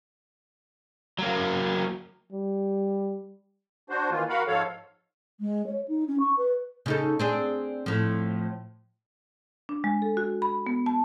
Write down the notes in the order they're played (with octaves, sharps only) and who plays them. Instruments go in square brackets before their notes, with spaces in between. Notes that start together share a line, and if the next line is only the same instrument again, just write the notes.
[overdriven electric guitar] F#3 A#3
[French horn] G3
[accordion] D4 F#4 C5
D#3 E3 A#3 F4
F#4 A#4 F5 F#5 B5
G#2 F3 A4 C#5 F5
[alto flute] G#3
C#5
D#4
C#4
C#6
B4
[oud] C#3 D#4 A4
C4 D4 G#4
A2 F3
[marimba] D4
G#3
A4
F#4
B5
B3
A5